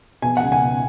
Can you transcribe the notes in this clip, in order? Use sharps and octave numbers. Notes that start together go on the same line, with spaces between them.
B2 G#5
C#2 F#5
G#5
B2